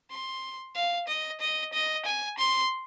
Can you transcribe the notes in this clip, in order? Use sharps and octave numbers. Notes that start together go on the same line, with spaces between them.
C6
F5
D#5
D#5
D#5
G#5
C6